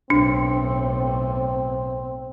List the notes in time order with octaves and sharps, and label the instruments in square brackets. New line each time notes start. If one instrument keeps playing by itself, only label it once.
[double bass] B1 A2 [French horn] C4 [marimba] D4